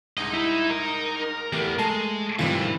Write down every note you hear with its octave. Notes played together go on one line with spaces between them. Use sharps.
C2 G#2 D#4 D#5
E4
A#4
E2 A3 B3 G4
G#3 A3 A5
D2 G2 D#3 E3 C4 F4